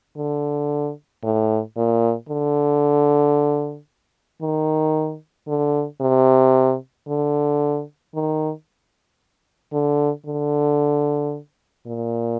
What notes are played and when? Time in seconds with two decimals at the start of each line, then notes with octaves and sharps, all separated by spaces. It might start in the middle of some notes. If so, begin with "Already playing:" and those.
0.16 D3
1.24 A2
1.76 A#2
2.29 D3
4.42 D#3
5.48 D3
6.01 C3
7.08 D3
8.14 D#3
9.73 D3
10.26 D3
11.86 A#2